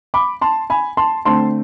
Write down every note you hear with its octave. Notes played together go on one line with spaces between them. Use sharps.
B5 D6
A5 C6
G#5 B5
A5 C6
D3 A3 C4 A5 C6